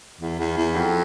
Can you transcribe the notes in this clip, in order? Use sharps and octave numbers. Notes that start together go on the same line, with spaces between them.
E2
E2
E2
F2